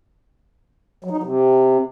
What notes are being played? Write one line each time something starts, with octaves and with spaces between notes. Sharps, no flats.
F#3
D#4
F#3
C3